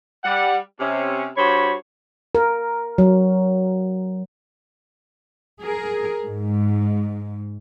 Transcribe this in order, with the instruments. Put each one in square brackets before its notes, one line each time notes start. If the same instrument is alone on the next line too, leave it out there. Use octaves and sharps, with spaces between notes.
[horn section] G3 F#5
C3 C#4
G2 F#4 C5 C#5 B5
[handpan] A#4
F#3
[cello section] G#4 A#4
G#2